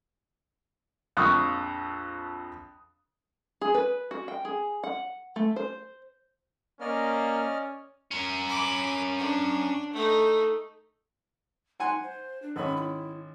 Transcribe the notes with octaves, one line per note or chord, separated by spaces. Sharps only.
A#1 F2 C#6 D#6 F6 F#6
G#4
B4
F#4
G5
G#4
F#5
A3
C5
A#3 C#4 D5 D#5 F6
C#4 A#4
B5 D6
D4
A3 D#4
D#4 F#5 G#5 C6
C5
D4
G#1 C#4 B5
E4